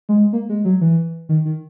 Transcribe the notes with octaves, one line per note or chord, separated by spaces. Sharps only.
G#3
A#3
G#3
F#3
E3
D#3
D#3